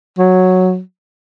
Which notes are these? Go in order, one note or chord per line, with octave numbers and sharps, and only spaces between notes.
F#3